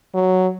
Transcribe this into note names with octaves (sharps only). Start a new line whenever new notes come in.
F#3